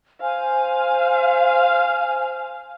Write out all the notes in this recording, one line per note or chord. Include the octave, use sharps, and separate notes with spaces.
C5 F5 G#5